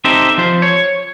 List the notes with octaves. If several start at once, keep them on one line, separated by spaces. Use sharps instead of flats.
C4 D#4 G4 A4 C5 E5
F3 C5
C#5